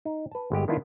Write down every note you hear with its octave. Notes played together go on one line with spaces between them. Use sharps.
D#4
B4 A5
G1 G#3 G4 D#5
D#3 B3 D4 E4 F4